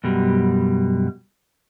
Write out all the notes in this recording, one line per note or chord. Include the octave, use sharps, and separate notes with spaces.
F#2 B2 G3